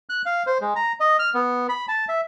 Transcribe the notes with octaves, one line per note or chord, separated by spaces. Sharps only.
F#6
F5
C5
G#3
A#5
D#5
F6
B3
B5
A5
E5